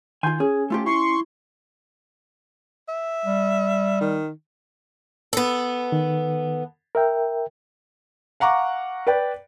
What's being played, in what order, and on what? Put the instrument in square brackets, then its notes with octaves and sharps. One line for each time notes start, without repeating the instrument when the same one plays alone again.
[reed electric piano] D#3 C6 G6 [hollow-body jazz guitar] F4 G#5
[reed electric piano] C#4 G#5 [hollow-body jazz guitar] G#4
[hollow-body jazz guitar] A3 F4 G4
[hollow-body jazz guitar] E4 [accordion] C6 C#6
[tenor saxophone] E5
[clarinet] G3
[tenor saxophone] D#3
[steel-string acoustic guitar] B3 A4
[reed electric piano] D#3
A#4 E5 G5
[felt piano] F5 F#5 A#5 C#6 D6
B4 D5 G5